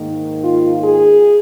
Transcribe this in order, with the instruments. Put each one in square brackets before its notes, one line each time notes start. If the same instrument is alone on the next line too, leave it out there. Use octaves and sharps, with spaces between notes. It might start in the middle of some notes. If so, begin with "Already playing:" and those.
Already playing: [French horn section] G#2 D#3 A#3
F4
G#4